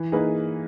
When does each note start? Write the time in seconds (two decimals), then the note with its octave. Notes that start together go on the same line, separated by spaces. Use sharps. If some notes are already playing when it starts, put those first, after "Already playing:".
Already playing: E3
0.12 A#3 D#4 G#4 B4